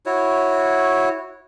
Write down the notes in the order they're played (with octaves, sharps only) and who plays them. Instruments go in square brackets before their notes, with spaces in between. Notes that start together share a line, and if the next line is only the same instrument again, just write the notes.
[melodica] E4 F#4 C#5